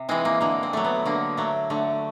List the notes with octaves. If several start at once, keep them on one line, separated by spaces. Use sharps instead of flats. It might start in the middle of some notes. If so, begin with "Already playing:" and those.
Already playing: C3
E3 G#3 C4
A#3
D3 A#3
C4
F#3 A3
B3
D3 A#3
F#3 A3
D3 A3